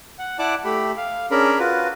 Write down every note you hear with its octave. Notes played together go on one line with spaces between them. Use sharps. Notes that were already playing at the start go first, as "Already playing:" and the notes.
F#5
E4 D5 F#5 A5 D6
A3 G4 B5
F5
C#4 D4 G#4 A#4 B5
F4 F#4 B4